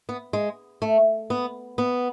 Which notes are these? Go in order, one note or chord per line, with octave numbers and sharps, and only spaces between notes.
B3
G#3
A3
B3
B3